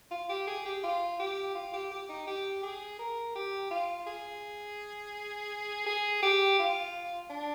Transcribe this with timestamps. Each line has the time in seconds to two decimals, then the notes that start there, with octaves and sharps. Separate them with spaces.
0.11 F4
0.29 G4
0.47 G#4
0.65 G4
0.83 F4
1.19 G4
1.55 F4
1.73 G4
1.91 G4
2.09 D#4
2.27 G4
2.63 G#4
2.99 A#4
3.35 G4
3.71 F4
4.07 G#4
5.86 G#4
6.23 G4
6.59 F4
7.30 D4